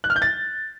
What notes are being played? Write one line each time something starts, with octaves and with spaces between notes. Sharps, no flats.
F#6
F6
G6
A6